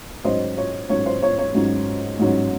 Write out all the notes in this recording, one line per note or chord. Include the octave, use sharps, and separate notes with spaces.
G#2 F#3 C#4 C5 D#5
C#5
G#2 F#3 C#4 C#5
C5
C#5
C#5
G#2 F#3 C#4
G#2 F#3 C#4